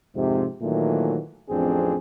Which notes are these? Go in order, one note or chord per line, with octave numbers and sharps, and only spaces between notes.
F2 G#2 C3
A#2 D#3 E3 F#3 A3
A1 F2 C4 D4 G#4